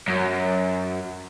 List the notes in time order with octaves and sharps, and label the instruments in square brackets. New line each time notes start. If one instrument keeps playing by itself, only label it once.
[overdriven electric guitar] F#2